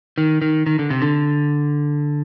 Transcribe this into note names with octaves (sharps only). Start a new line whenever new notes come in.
D#3
D#3
D#3
D3
C3
D3